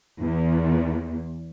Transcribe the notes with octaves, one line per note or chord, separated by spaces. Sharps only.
E2